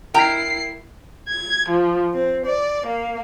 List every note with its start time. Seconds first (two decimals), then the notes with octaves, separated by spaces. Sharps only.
0.14 E4 A#4 G5 A#5 C7
1.29 G#6
1.70 F3
2.13 C4
2.46 D5
2.86 A#3